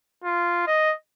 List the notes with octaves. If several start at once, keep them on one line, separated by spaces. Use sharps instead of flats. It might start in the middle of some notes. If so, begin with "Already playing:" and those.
F4
D#5